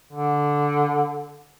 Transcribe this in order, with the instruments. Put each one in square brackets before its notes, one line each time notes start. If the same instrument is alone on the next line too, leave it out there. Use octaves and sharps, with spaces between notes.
[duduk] D3